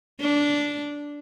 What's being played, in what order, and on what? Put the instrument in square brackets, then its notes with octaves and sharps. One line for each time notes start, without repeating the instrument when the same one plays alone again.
[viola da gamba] D4